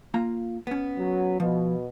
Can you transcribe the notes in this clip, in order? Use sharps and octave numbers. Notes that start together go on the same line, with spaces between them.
A#3 F4 A#5
B3 C#4
F#3
B2 F3